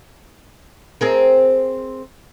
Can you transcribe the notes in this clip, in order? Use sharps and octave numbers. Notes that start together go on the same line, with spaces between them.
C4 G#4 A#4